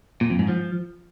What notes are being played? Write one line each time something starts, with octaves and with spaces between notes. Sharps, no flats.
A#2
F2
G#2
F3